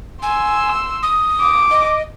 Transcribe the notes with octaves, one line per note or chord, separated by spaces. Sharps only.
G#5 C6 E6
D#6
D6
D#5